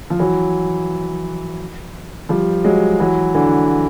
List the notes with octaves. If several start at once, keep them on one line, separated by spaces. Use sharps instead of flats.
F3
E3 F#3
F3 G3
F#3 G#3
E3 F#3
D3 E3